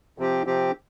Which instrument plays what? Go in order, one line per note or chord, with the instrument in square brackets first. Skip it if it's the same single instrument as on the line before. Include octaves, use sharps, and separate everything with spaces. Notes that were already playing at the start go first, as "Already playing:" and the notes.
[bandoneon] C3 F3 C4 G4
C3 F3 C4 G4